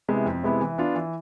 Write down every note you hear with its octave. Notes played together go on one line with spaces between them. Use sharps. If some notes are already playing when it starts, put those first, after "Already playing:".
C3 G#3 B3 E4
F2
C3 G#3 B3 E4
E3
B3 D4 F4
E3